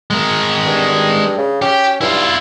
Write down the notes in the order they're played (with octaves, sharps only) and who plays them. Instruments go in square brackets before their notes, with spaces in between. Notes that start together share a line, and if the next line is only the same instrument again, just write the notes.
[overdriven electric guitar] G#3 A#4
[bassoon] G2
C#3
[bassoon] C#4 [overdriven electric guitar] G4
[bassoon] G2 [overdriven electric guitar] E4 F4